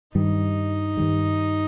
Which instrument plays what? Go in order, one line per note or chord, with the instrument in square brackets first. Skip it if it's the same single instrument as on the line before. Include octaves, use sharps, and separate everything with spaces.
[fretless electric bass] G2 D#3 G3 [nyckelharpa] D#4
[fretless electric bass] G2 D#3 G3